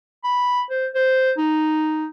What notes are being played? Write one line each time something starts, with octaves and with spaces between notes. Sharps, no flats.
B5
C5
C5
D#4